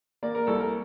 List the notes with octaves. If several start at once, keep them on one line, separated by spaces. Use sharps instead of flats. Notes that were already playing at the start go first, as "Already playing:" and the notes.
A#3 D5
A#4
C2 A4
A#4